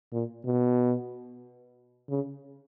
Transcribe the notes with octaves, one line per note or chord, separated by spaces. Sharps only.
A#2
B2
C#3